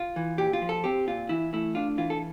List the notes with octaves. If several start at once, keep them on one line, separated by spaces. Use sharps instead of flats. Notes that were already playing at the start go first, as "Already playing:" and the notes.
Already playing: F4
E3
A#2 G4
F4
F3
A4
C4 G4
A#2 F4
E3 E4
A3 E4
D4 F4
E3 F4
A4